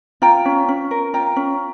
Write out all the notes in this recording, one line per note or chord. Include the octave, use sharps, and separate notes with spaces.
F4 G5 A#5
C#4
C#4
A#4
F4 G5 A#5
C#4